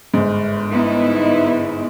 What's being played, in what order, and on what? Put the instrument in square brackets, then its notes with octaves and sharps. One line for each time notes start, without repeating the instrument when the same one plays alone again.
[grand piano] G1 G#2
[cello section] B3 D#4 E4